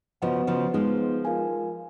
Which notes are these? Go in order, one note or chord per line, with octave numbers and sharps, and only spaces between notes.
C#3 F3 B3 F#4 B4 D#5 F#5
C#3 F3
F3 G#3 B3 D#4 G#4 B4 D#5
F4 A#4 F5 G#5